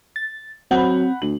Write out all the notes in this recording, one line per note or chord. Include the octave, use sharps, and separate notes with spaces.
A6
F#3 C4 F#5 B5
D2 F#7